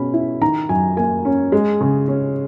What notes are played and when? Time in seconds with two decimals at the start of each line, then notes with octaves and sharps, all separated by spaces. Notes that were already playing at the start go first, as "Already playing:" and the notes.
Already playing: B2 G#3 C#4 B5
0.14 E4
0.41 D#3 A#5
0.69 F#2 G#5
0.97 A#3 G#5
1.25 C#4
1.52 G#3
1.81 C#3
2.08 C#4